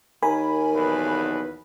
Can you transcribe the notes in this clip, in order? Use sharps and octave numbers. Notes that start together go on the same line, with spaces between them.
D#2 A#4 G#5 B5
B1 E2 B4